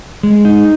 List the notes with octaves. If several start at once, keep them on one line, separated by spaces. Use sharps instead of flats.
G#3
D#4